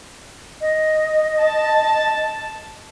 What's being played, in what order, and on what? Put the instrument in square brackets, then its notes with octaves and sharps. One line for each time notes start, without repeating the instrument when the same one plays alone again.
[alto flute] D#5
[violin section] A5